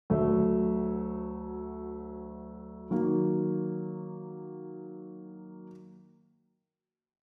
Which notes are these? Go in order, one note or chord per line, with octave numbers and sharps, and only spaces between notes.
D2 D3 F#3 A3
D#3 F#3 A#3